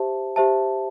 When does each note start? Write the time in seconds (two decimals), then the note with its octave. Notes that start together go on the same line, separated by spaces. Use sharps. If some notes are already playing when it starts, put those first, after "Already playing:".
Already playing: G4 C5 E5 A5
0.36 G4 C5 E5 A5